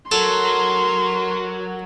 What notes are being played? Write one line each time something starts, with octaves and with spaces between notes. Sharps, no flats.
F#3 A4 A#4 C6